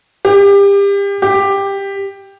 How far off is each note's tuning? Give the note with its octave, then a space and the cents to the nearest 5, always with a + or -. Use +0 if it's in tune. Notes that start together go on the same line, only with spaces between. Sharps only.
G4 +30
G4 +10